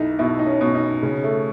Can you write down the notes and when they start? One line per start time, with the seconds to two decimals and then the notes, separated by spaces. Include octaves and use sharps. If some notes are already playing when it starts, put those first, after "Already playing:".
Already playing: B1 D#4 E4
0.19 B2 E4
0.39 D#4
0.46 C#4
0.61 B2
0.75 D#4
1.02 C#3 C#4
1.24 A3